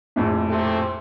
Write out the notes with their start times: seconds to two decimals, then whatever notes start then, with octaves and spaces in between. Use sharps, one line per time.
0.16 A#1 F2 A2
0.48 C3 A3